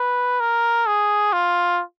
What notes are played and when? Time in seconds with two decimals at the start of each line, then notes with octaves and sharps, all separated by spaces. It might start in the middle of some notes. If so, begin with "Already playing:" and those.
Already playing: B4
0.40 A#4
0.87 G#4
1.33 F4